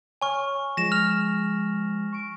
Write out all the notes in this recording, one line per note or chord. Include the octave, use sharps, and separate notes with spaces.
C#5 G#5 C#6 F6
F3 G#3 A#6 E7
F6 F7
C#6 D7